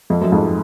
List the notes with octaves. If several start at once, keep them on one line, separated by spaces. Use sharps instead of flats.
F2
F#2
F2 G#2